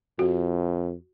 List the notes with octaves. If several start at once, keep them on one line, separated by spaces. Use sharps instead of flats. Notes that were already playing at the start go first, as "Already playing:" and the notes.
F2 F#4